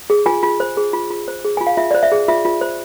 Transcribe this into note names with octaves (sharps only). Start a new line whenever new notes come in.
G#4
F4 G#5
F4
C5
G#4
F4
F4
C5
G#4
F4 G#5
F5
F4 E5
C5 D5
E5
G#4
F4 E5
F4
C5